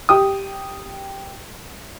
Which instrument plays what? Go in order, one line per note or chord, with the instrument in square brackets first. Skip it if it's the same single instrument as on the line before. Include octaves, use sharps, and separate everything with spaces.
[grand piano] G4 G5 D#6